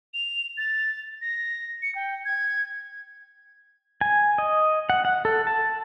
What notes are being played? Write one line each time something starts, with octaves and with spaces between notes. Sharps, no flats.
F7
A6
A#6
C#7
G5
G#6
G#5
D#5
F#5
F#5
A4
A5